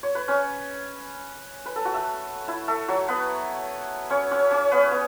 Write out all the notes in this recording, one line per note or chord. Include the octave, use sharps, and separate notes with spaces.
C#5
B4
C#4 C#5
B4
A4
F#4
A3 A4
E4
A3 A4
F#3 F#4
B3 B4
C#4 C#5
C#4 C#5
C#4 C#5
B3 B4
B3